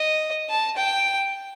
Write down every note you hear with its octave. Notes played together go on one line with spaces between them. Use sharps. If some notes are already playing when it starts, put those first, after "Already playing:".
Already playing: D#5
A5
G5